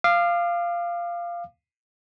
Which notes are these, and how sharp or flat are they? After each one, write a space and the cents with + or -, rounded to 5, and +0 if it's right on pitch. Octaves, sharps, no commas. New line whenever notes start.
F5 -10 D6 +35